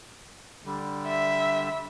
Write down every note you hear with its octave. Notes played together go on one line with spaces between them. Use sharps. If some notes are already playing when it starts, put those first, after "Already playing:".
D3 G3
E5